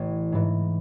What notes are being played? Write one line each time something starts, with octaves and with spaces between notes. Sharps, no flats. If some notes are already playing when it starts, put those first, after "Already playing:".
Already playing: A1 E3 C#5
G#2 E3